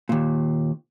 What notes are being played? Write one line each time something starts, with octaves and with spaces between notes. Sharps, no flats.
D#2 A#2